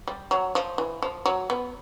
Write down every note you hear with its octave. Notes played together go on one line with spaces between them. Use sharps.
G3
F#3
F3
E3
F3
F#3
B3